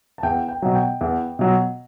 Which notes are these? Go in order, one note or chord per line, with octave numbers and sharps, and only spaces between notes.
A5
E2 G5
G5
B2 F#3
G5
E2
B2 F#3